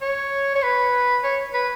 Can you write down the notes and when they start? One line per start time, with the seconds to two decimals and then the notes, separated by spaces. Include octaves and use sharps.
0.02 C#5
0.55 C#5
0.63 B4
1.24 C#5
1.54 B4